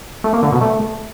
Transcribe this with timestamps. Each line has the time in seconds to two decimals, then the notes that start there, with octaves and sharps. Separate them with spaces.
0.24 A3
0.33 A#3
0.43 D3
0.52 B2
0.61 A3